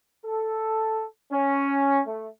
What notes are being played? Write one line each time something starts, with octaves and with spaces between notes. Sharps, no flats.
A4
C#4
A3